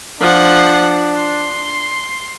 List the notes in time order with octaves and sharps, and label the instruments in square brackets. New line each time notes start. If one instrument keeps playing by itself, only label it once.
[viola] F3 F#5 [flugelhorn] D4
[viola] C6